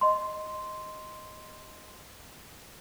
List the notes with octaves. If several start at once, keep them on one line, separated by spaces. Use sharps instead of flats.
D#5 C6